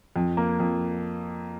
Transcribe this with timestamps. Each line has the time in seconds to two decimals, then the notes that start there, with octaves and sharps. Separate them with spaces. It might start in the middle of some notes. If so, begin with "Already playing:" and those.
0.16 F2
0.37 A#3
0.60 F2